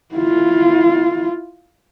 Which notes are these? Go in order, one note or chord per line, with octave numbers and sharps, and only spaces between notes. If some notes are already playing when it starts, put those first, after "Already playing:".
E4 F4